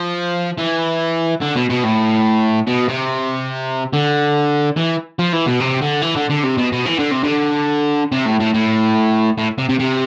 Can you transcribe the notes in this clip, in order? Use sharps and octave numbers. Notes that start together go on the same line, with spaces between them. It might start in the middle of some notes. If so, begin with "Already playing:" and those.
Already playing: F3
E3
D3
B2
B2
A2
B2
C3
D3
E3
F3
E3
B2
C3
D3
E3
D3
D3
C3
B2
B2
E3
D3
C3
D3
C3
A2
A2
A2
A2
C3
C3
C3